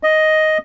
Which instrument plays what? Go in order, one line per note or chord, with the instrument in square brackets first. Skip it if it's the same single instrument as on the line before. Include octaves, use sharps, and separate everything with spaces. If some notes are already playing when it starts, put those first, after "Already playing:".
[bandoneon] D#5